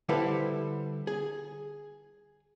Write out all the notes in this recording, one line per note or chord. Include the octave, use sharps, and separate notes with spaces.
D3 G3 E4 A4 B4 C5
G#4